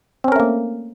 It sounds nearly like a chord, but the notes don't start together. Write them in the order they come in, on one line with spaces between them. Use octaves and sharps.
C4 C#4 A#4 A3 A#3